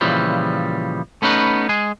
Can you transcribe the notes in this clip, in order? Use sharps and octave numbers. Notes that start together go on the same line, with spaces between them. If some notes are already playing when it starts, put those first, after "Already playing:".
A#2 C#3 E3 F3 G3
A3 B3 C#4 D#4 B4
G#3 G#4